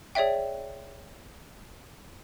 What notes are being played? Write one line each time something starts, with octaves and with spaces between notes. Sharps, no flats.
G#4 C#5 D5 E5 G5